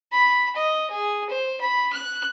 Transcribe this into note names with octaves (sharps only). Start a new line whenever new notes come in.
B5
D#5
G#4
C5
B5
F#6